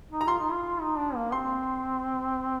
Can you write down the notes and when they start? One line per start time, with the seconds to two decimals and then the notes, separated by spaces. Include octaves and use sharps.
0.11 D#4
0.21 A#5
0.28 F4 C6
0.40 D#4
0.52 F4
0.81 D#4
0.98 D4
1.15 A#3
1.32 C4 C6